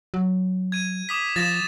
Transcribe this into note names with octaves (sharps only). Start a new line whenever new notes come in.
F#3
G#6 D#7
D6 D#6 B6
F3 A6 A#6 E7